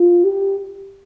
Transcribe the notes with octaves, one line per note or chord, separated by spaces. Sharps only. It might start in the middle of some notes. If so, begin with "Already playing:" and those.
Already playing: F4
G4